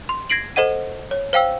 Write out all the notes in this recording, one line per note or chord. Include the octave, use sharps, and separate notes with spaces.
C6
G#6 A#6 C7 D7 F#7
A4 C5 D#5 F#5 D#7
C#5
C5 F5 G5 E6